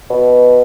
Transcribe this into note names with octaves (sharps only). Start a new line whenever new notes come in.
B2